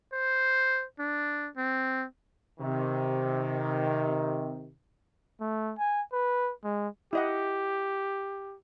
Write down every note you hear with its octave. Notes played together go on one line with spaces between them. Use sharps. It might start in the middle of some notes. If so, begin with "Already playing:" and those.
C5
D4
C4
C3 D#3
A3
G#5
B4
G#3
E4 G4 D#5 F#5